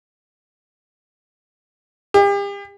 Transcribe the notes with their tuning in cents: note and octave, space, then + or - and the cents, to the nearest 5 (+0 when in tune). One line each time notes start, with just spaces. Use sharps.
G4 +40